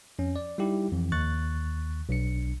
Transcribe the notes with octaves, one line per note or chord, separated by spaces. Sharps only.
F2 C#4
D5
G3 D#4 E4 G4
F2 E3
D#2 C#6 F#6 A6
B1 D4 C#7